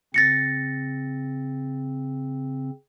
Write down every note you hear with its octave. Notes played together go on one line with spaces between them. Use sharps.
C#3 C4 A6 A#6 C#7